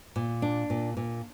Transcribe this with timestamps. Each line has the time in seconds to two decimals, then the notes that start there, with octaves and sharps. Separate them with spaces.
0.16 A#2
0.42 D4
0.70 A#2
0.97 A#2